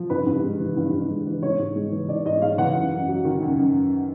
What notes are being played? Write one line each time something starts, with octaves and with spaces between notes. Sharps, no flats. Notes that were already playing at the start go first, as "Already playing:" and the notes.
Already playing: F3
G2 B4
G2
G#3
E3
G2
G2
G#3
E3
G#2 C#5
G#2
G#3
E3
G#2 D5
G#2 D#5
G#3 F5
E3 F#5
F#2
F#2
F#3
D#3
F#2
F#2